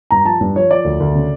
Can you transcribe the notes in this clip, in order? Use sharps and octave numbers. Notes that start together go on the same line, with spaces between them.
G2 A#5
F3 A5
G2
F3 C#5
F3 D5
D2
D2
C#3